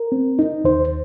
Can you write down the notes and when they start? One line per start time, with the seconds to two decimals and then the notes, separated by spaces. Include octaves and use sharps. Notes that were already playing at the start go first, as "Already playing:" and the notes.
Already playing: A#4
0.12 C4
0.39 D#4
0.64 D#2 C5